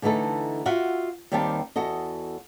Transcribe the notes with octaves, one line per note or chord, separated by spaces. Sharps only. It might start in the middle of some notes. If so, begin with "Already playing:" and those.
D3 E3 A3 D#4 A4
F4 F#4 E5 F#5
D#2 D#3 G3 C4 G4 A5
E2 F#4 A4 D#5